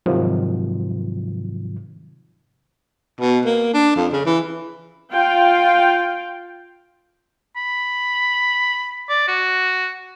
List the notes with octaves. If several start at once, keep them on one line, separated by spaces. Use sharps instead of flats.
G#2 C3 D#3 F3 F#3
B2
A#3
D4
F2
C#3
E3
F4 F5 G5
B5
D5
F#4